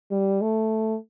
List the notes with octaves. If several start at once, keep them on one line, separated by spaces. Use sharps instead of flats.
G3
A3